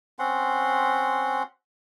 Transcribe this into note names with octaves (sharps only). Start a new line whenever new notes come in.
C4 C#4 F#5 C6